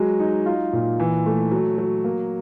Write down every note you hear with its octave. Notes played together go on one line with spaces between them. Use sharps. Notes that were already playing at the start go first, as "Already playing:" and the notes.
Already playing: F#3 G#3
D#4
F4
A#2
E3
A3
F#3
F#3
A#3